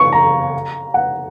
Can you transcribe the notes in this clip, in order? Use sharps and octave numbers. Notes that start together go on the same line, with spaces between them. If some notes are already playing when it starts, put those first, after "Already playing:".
Already playing: C#6
A#5
F#5